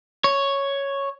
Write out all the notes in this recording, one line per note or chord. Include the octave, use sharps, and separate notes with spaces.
C#5